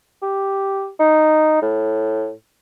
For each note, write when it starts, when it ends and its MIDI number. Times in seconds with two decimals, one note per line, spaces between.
0.22 0.88 67
1.00 1.59 63
1.62 2.31 45